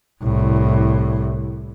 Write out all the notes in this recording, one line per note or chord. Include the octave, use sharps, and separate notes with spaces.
C2 A2